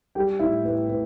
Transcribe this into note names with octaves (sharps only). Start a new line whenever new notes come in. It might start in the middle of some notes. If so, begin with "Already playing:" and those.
G3 G4 G5
A2 E4 E5
A2 B4
A2 B4